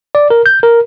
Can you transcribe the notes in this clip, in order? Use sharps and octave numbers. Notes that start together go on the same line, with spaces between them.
D5
A#4
G6
A#4